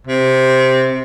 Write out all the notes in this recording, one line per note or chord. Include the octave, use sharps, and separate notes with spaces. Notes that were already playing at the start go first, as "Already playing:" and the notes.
C3